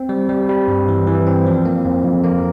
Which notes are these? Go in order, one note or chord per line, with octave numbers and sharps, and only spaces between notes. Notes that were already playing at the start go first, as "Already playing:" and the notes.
Already playing: C4
G3
G3
G3
G2
E3
E3
C4
F3
A#3
F2
F2
A#3